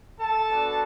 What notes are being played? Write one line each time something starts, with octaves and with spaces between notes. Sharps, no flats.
A4 A5
B3 D4 F#4